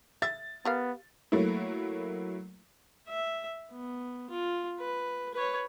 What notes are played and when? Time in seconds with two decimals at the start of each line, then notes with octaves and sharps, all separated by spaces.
0.22 E5 A6
0.65 B3 G4 A#4 F5
1.32 F#3 A3 A#3 E4
3.09 E5
3.71 B3
4.30 F4
4.79 B4
5.34 B4 C#5